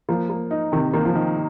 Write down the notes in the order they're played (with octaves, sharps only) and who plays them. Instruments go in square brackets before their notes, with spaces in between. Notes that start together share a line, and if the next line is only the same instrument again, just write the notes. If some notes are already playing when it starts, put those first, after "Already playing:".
[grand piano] F3 [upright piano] A#3
[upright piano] A#3
D#4
[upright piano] C3 [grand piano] D#3
[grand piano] D#3 [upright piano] A#3
[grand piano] F3
[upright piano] D#3